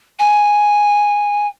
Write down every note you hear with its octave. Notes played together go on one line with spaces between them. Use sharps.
G#5